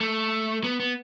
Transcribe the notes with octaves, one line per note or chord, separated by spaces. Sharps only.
A3
B3
B3